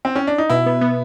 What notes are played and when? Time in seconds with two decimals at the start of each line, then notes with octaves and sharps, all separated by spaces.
0.05 C4
0.16 C#4
0.27 D4
0.38 D#4
0.50 B2 E4
0.66 B3
0.81 B3